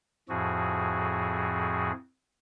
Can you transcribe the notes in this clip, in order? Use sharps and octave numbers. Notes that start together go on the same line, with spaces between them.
F2 A2 F3 F#4 G#4